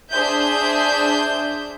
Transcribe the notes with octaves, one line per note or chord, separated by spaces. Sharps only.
D4 G#4 C5 E5 G6